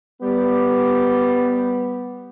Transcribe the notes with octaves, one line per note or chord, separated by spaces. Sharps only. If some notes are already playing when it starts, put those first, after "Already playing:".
G3 B3 G4